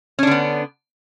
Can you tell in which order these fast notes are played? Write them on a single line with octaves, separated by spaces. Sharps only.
C#4 D4 D3 B3